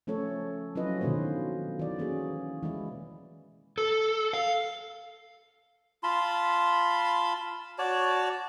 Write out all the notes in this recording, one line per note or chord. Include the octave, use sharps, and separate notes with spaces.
F3 A3 C#4 A4 C#5
F#3 C#4 E4 F4 B4 D#5
B2 D3 D#3 A#3 C5
E3 D5
A#3 C#4 F#4 G#4
E3 G#3 E4
A4
F5
F4 A5 B5 C6
F#4 C#5 D5 A5